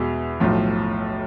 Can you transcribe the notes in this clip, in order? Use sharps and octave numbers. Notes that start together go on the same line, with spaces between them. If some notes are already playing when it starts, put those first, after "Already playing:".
Already playing: E2 B2 G#3
B1 A2 F3